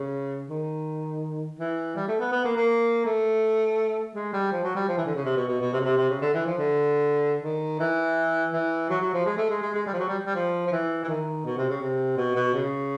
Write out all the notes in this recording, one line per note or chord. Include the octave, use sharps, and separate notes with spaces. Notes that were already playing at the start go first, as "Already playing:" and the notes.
Already playing: C#3
D#3
E3
G3
A3
B3
B3
A#3
A#3
A3
G#3
G3
F3
F#3
G3
F3
E3
D3
C#3
C3
B2
B2
B2
C3
C#3
C3
C3
C#3
D3
E3
F3
D3
D#3
E3
E3
F#3
F#3
F3
G#3
A3
G#3
G#3
G#3
G3
F3
F#3
G3
G3
F3
F3
E3
E3
D#3
B2
C3
C#3
C3
B2
B2
C#3